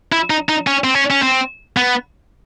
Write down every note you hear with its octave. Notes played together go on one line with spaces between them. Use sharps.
E4
D#4
D#4
C#4
C4
C#4
C#4
C4
B3